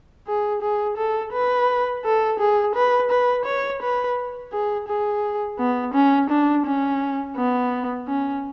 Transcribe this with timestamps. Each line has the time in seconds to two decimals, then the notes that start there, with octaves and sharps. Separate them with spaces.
0.27 G#4
0.62 G#4
0.97 A4
1.33 B4
2.05 A4
2.40 G#4
2.75 B4
3.10 B4
3.46 C#5
3.82 B4
4.52 G#4
4.88 G#4
5.59 B3
5.94 C#4
6.30 D4
6.66 C#4
7.36 B3
8.08 C#4